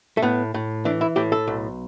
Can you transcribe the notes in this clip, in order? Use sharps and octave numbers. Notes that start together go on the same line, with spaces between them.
A3
A2 B3
A2
E3 D4
E4
A2 G4
A4
B1